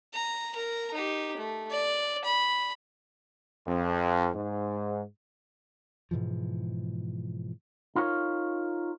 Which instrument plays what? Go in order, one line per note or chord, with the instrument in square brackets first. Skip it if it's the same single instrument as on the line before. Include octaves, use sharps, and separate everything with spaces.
[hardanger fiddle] A#5
A#4 A#5
D#4 G4
A3
D5
B5
[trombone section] F2
G#2
[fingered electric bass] G#2 B2 E3 F3
[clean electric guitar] D#4 F4 A#4 C#5